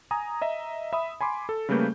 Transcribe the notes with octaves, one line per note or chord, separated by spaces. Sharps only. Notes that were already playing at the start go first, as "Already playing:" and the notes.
G#5 A#5 D#6
D#5 E5 A#5
E5 B5 D#6
G#5 B5 C6 D6
A4
C#3 G3 A3 A#3 B4 G6